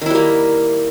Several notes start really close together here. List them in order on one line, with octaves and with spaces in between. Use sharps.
D#3 E4 G3 A#3